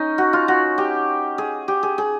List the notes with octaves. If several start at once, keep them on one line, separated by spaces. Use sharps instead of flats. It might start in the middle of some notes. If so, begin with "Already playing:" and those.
Already playing: C#4 D#4
F#4
F4
F#4
G4
G#4
G4
G#4
G#4